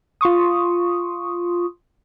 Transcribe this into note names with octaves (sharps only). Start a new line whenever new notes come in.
F4 C6 C#6 D#6